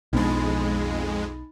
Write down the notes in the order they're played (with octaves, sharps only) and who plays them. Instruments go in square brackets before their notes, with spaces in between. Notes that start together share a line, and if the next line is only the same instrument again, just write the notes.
[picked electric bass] B1 B3 D4 [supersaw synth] F2 G#3 [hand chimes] D#4 B5 A6